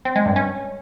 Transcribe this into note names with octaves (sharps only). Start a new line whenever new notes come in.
C4
G#3
G2
C#4